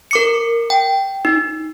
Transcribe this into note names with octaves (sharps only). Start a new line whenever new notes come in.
A#4 D6 C#7
G5
D#4